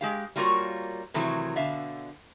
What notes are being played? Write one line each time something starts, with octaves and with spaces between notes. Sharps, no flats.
G#3 G4 F5
G3 A#3 F4 F#4 A#4 C#5
C3 D#3 E3 F#3 A3
B2 D3 E5 F5